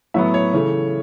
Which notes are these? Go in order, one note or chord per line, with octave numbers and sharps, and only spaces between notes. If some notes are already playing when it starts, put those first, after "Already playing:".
A2 F#3 B3 E5
C#5
C#3 E3 A3